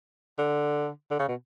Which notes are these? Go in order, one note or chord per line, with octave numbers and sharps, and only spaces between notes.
D3
D3
C#3
B2